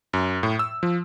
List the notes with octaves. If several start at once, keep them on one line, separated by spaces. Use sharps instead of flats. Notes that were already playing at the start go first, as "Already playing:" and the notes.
F#2
A2
E6
F3